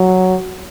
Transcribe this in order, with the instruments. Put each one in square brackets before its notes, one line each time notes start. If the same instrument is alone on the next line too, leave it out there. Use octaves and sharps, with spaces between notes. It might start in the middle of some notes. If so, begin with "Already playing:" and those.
Already playing: [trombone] F#3